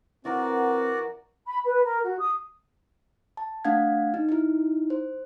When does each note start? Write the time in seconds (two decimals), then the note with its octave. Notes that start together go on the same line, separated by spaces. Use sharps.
0.25 E3 C4 F#4 A#4 D5 F#5
1.47 B5
1.65 B4
1.84 A#4
2.04 F#4
2.19 D#6
3.37 A5
3.65 A3 D4 F5 F#5 G#6
4.14 D#4
4.29 D#4 E4
4.90 C5